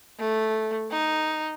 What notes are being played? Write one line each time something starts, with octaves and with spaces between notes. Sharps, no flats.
A3
D#4